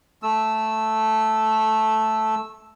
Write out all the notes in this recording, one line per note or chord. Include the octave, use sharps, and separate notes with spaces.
A3 E6